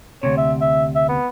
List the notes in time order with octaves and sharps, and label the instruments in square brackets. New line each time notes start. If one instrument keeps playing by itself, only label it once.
[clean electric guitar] D2 C3 [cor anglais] C#5
[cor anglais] E5
E5
E5
B3